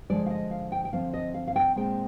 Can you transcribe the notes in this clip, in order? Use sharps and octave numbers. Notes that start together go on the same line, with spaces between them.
D3 F3 G#3 D5
F5
D#5
F5
G5
G5
D3 F3 C4 F5
D#5
F5
F5
G5
A#2 G#3 C4 G5